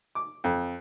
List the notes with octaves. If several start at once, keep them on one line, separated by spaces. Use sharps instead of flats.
D6
F2